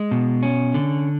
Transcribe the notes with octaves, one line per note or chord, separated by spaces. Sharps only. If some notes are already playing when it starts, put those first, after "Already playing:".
Already playing: G#3
B2
C#4
D3